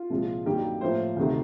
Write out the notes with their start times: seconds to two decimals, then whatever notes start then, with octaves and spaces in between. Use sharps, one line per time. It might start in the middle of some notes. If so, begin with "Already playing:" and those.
Already playing: F4
0.10 C2 A#2 F3 G#3
0.45 G2 D#3 F#3 A#3 G4
0.81 A2 F3 A#3 C5
1.16 D2 C3 D#3